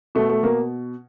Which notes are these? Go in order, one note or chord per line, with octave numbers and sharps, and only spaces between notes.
B2 A3
A3
B2 A#3